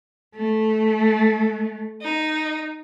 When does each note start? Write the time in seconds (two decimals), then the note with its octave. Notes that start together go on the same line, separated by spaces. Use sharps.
0.35 A3
2.01 D#4